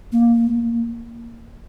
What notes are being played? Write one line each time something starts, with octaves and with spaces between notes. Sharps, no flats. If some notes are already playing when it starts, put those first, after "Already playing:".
A#3